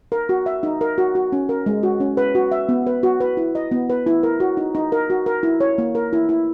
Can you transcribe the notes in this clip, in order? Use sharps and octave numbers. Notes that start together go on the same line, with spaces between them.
A#4
F#4
E5
D#4
A#4
F#4
F#4
C#4
A#4
G#3
F#4
C#4
B4
F#4
E5
B3
B4
F#4
B4
E4
D#5
B3
B4
E4
A#4
F#4
D#4
D#4
A#4
F#4
A#4
E4
C#5
A#3
A#4
E4
E4